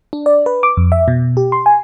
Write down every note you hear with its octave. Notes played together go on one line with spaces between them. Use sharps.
D4
D5
B4
D6
F2
E5
B2
G4
C6
G#5